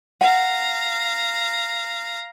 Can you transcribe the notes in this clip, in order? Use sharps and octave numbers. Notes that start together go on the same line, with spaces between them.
F5 F#5 A#5